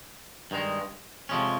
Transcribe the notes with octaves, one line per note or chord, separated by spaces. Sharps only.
G2 D#3 G#3
F2 C3 F3 G#3 C#4